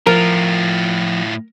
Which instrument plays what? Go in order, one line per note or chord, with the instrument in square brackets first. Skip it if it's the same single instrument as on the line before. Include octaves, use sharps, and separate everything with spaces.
[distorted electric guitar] A2 F4 [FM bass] F3 [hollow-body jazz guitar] A#4